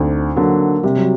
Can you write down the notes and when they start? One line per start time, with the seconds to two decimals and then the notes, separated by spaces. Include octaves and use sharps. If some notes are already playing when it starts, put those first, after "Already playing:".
Already playing: D2 C4 D4 D#4
0.36 D3 F#3 A#3
0.83 C3 G3
0.96 F#3